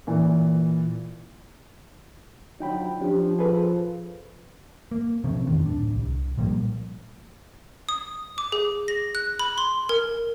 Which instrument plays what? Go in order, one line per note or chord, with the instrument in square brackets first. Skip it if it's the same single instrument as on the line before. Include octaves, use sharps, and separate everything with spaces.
[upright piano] A#2 E3
[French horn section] D3 F3 F#3 [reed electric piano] D#4 G5 B5
[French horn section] F3 [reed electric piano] C#4 D4 G4
[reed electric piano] G#4 A4 B4
[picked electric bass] A#3
C3 F3 C4 C#4
D#1 F2 D#3 A3
D1 D4
C2
A#2 F3 G3 A#3
[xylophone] D#6
D6
G#4
A#6
F#6
B5
C6
A#4